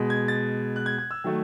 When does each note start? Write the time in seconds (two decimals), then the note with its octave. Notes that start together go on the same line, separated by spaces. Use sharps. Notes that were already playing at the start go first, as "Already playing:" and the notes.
Already playing: B2 G#3
0.10 G#6
0.28 A6
0.76 F#6
0.86 G#6
0.98 G#6
1.11 E6
1.24 D#3 F#3 A3